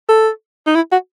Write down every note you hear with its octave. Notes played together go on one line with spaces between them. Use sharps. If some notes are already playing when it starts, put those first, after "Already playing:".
A4
D#4
E4
F#4